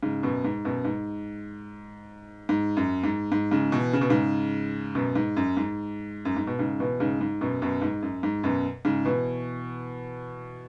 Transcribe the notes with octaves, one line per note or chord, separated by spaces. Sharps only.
G#2 C#3
F#2 B2
G#2
F#2 B2
G#2
G#2
F#2
G#2
G#2
G#2 C#3
B2 E3
C#3
B2
G#2 C#3
F#2 B2
G#2
F#2
G#2
F#2
G#2
B2
G#2 C#3
B2 E3
G#2 C#3
G#2
F#2 B2
F#2 B2
G#2
F#2
G#2
F#2 B2
G#2 C#3
B2 E3